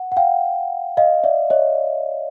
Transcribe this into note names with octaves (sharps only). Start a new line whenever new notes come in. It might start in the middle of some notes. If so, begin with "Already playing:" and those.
Already playing: F#5
F#5
F5 G5
D#5 F5
D5 E5
C#5 D#5